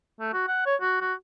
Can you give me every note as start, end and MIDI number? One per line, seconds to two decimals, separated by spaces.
0.20 0.31 57
0.33 0.46 66
0.48 0.64 78
0.66 0.76 73
0.81 0.99 66
1.01 1.14 66